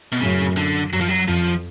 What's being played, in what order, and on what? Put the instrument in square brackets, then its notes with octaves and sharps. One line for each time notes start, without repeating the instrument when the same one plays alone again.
[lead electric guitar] B2
[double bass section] F#2 A2 [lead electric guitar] C#3
[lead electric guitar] D3
[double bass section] F#2 [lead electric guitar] F#3
[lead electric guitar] F3
F#3
[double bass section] F2 [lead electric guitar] F3